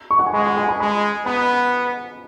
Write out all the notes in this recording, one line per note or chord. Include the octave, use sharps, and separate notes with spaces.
C#6
F#5
G#5
G#3 B5
F#5
G#5
B5
G#3 B5
B3 B5